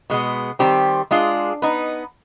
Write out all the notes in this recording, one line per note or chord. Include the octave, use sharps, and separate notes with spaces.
B2 G#3 B3
D#3 G3 C4 G4 C5
G#3 D4 F4 G#4
B3 D#4 B4